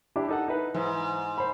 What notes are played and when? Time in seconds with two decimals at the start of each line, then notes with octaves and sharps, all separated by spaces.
0.16 D4 E4 G4
0.29 D#4 A4 F#5
0.48 D#4 E4 B4
0.75 G#2 E3
1.38 C5 B5